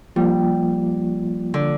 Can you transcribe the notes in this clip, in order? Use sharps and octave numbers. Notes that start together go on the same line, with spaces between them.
F3 G3 A#3 F4
D3